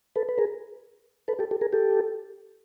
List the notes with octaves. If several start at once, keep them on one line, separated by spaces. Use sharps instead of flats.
A4 B4
B4
G#4 A#4
A4 B4
G4 A4
G4 A4
G#4 A#4
G4 A4